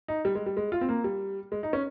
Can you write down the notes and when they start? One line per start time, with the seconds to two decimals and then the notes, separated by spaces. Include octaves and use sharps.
0.08 D#4
0.25 G3
0.35 G#3
0.46 G3
0.57 G#3
0.72 F4
0.81 C4
0.89 A#3
1.04 G3
1.52 G#3
1.63 D#4
1.73 C#4